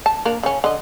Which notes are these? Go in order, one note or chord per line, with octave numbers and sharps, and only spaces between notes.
A5
A#3 D4 A#4
C#3 C#4
D3 D#5